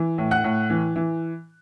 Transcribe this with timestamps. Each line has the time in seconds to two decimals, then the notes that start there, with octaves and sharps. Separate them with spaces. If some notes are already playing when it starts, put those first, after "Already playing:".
Already playing: E3
0.18 A2
0.31 F#5 F#6
0.44 A2
0.70 E3
0.96 E3